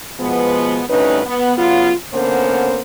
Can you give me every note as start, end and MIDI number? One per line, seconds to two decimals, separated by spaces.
0.19 0.82 47
0.19 0.82 53
0.19 0.82 56
0.19 0.82 59
0.88 1.20 38
0.88 1.20 43
0.88 1.20 61
0.88 1.20 63
0.88 1.20 71
1.26 1.54 59
1.57 1.92 49
1.57 1.92 54
1.57 1.92 59
1.57 1.92 65
2.13 2.82 50
2.13 2.82 58
2.13 2.82 59
2.13 2.82 61
2.13 2.82 72